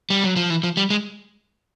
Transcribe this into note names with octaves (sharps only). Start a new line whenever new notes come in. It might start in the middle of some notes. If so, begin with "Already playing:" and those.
G3
F#3
F3
E3
F3
G3
G#3